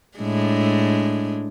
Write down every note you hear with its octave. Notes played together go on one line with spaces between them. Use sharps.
A2 G#3 D4